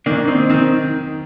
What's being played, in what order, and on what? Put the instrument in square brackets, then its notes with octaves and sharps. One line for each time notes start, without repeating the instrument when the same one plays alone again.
[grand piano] D#3 [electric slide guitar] A#3 D4
[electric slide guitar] C4 D#4
[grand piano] D#3 [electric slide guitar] C4 D#4